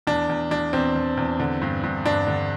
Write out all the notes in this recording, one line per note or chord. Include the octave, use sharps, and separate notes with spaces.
E2 D4
E2
E2 D4
E2 C4
E2
E2
D3
G2
G2
G2 D4
D3